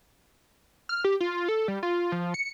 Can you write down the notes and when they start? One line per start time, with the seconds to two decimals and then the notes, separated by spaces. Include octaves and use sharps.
0.89 F6
1.04 G4
1.20 F4
1.48 A4
1.68 G3
1.83 F4
2.12 F3
2.34 C#7